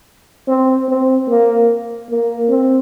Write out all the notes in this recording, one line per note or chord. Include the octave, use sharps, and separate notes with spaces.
C4
C4
A#3
A#3
C4